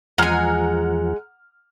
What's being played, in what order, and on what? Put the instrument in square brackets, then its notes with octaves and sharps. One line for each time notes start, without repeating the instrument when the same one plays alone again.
[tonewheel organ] E2 F3 [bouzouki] G#3 G#5 [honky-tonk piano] F#5 A#5 F6